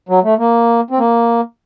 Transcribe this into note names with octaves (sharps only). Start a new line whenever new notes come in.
F#3
A3
A#3
C4
A#3